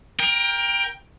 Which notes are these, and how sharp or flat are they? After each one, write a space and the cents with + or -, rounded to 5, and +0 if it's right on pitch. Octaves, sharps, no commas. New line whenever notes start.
A#4 +20 G5 +20